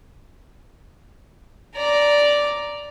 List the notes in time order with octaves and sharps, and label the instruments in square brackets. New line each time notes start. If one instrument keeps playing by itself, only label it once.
[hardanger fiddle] D5 A#5